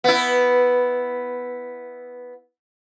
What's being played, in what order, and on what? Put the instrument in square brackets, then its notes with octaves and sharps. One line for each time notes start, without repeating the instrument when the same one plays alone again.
[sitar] B3 E4